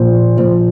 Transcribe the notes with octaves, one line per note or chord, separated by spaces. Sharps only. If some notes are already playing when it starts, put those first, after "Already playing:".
Already playing: A#2 F3 C5
A#2 F3 C5